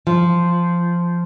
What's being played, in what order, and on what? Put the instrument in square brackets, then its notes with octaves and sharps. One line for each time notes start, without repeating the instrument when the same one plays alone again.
[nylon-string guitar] F3